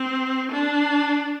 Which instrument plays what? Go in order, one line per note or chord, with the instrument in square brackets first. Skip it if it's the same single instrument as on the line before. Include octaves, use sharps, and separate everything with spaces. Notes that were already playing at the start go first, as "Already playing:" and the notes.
Already playing: [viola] C4
D4